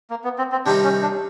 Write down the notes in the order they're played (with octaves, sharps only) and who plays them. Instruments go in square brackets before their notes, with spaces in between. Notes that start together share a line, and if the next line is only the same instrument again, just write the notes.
[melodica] A#3
B3
C4
C4
[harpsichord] C3 D#3 G3 C4 D#4 [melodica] D4
[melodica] C#4
D4